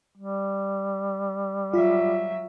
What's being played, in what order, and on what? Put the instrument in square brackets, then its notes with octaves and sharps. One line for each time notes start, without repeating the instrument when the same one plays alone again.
[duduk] G3
[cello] F#3 E5 [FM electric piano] F4